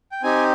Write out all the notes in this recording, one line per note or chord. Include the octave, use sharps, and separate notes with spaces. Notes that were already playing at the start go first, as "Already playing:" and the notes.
G5
C4 D#4 G4 G#5